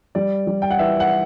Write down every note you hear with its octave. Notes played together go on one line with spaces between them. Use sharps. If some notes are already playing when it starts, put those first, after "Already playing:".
G3 D5
G3
G5
F#5
E3 E5
F#5